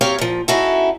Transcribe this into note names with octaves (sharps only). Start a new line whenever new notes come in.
F#3 C4 G4 C#5 F5
A#2 F3
C#4 D#4 E4 F#4 G#4 A4